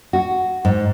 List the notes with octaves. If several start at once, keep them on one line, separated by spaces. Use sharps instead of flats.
F#4
G#2